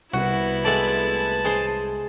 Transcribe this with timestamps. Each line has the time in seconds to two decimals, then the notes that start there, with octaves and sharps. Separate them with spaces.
0.13 C2 B3 E4 F#4
0.65 G#3 A3 D5 A5
1.45 G#3 G#4 C5